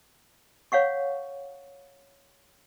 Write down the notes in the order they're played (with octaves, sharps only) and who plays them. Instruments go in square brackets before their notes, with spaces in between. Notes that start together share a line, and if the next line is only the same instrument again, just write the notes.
[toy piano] C#5 F5 F#5 C#6